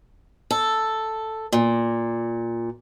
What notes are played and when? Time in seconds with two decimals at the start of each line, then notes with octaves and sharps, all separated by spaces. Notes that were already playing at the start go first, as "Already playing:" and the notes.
0.51 A4
1.53 A#2